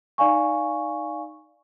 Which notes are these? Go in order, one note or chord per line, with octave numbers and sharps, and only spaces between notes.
D#4 D5 F5 G#5 C#6